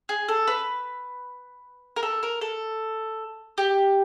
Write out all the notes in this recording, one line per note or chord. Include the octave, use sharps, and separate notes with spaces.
G#4
A4
B4
A#4
A4
A#4
A4
G4